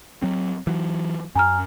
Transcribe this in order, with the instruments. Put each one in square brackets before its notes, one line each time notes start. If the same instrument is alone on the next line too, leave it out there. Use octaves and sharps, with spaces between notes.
[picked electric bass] F#3 C4
E3 F#3
[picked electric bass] F#2 [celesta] G#5 A#5 F6